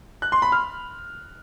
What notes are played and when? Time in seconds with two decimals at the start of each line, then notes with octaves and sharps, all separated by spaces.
0.22 F#6
0.32 C6
0.42 B5
0.52 F6